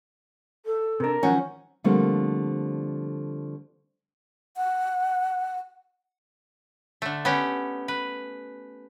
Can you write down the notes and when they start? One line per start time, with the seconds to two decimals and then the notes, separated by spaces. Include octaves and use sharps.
0.66 A4
1.00 C3 D4 A#4
1.23 D#3 F3 F#3 C#4 F#5
1.84 D3 F3 G3 A3 A#3 C4
4.57 F#5
7.02 D3 A3
7.25 B3 C#4 G4
7.88 B4